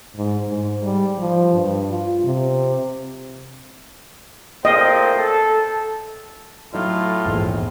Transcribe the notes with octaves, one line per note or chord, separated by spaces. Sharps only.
G#2
G#2
G3
F3
G2
F4
C3
A#2 A3 C4 D#5
A4
A2 F#3 D#4 F4
A#1 E2 G#2